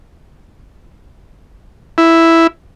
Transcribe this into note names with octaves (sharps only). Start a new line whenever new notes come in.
E4